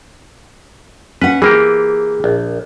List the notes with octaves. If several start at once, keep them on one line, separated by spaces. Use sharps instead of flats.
C#4 B4 F#5
E3 A#3 G4 G#4
A#1